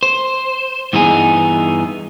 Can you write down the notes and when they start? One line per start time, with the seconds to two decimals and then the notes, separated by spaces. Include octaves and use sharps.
0.03 C5
0.93 G2 E3 B3 D#4 G#4